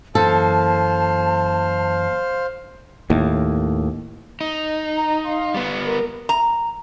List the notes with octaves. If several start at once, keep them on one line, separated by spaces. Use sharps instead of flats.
F#2 E3 A#3 A4 C5 F5 A5
D#2 A2
D#4
A#5
F5 C6
G3 B3
A#4
A#5